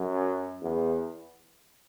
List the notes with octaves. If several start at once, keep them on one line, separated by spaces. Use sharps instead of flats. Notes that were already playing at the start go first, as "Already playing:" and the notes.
Already playing: F#2
E2